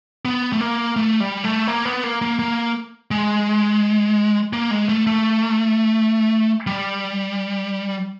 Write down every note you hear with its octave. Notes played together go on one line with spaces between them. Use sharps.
B3
A3
A#3
A3
G3
A3
A#3
B3
A#3
A#3
A#3
G#3
A#3
G#3
A3
A3
G3